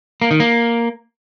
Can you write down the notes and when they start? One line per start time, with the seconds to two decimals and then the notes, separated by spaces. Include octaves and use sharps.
0.22 A#3
0.31 D#3
0.40 A#3